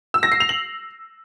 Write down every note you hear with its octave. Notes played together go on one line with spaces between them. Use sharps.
E6
A#6
C7
F7
F#7